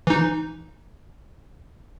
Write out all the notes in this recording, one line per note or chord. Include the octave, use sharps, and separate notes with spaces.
E3 D#4